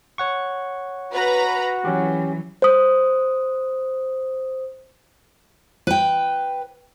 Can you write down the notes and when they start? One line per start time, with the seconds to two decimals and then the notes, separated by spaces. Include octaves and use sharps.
0.18 C#5 F#5 C#6
1.12 F#4 B4 A#5 B5
1.85 E3 F#3 C#4 G4
2.62 C5 D#6
5.87 B4 G5